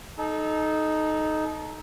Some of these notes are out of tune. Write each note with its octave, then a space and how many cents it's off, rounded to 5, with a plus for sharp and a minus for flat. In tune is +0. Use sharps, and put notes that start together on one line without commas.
D#4 +0 A4 -30